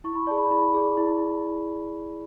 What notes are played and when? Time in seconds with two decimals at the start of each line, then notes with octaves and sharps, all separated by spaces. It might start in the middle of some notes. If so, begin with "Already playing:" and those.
0.04 E4 C#6
0.15 B5
0.27 G#4 D5 A5
0.38 B5
0.51 E4 B5
0.74 G#4 D5
0.97 E4